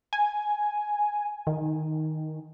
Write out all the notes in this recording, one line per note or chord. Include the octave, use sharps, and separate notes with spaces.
G#5
D#3